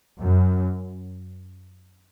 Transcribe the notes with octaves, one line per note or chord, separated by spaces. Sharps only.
F#2